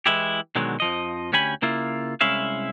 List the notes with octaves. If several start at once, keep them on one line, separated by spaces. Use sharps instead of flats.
E3 G#3 E4 G4
B2 D3 D#3 F#3 G#3
F2 F3 D#5
D2 C#4 G4 G#5 B5
C#3 A#3 E4 F4
C2 G#3 C#4 E4 E5 F5